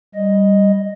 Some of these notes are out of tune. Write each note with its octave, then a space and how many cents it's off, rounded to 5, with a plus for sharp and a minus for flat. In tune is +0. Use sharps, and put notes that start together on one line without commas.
G3 +0 D#5 +0